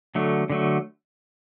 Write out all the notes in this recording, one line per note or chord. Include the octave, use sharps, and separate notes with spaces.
D3 F#3 A3
D3 F#3 A3